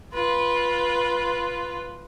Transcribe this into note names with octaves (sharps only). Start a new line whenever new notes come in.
F4 B4